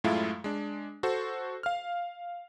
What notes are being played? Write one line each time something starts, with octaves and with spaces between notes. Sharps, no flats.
F#2 A2 G#3 A3 E4 F4
G#3 D4
F#4 A4 C5
F5 F6